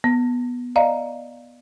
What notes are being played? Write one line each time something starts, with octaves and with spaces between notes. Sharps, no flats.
B3
D5 D#5 F5 A#5